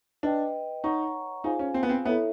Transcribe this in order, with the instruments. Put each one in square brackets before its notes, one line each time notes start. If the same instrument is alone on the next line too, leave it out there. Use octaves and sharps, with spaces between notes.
[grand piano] D4 [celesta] B4 D#5 G5
[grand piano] D#4 [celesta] C#5 F#5 A#5 C#6
[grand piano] D#4 [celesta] F4 G#4 C5 F5 G#5
[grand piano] C#4
C4
B3
C4
[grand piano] B3 [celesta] E4 A4 C#5 E5